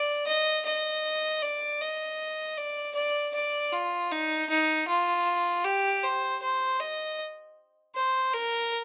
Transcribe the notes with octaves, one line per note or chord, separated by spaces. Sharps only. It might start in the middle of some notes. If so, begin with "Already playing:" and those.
Already playing: D5
D#5
D#5
D5
D#5
D5
D5
D5
F4
D#4
D#4
F4
G4
C5
C5
D#5
C5
A#4